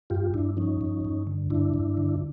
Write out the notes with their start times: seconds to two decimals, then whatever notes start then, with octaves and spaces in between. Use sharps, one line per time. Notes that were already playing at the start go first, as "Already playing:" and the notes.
0.10 G2 F4 G4
0.34 G2 D4 E4
0.57 F3 C#4 D#4
0.81 G2
1.05 G2
1.27 D3
1.50 G2 D4 E4
1.74 G2
1.97 D3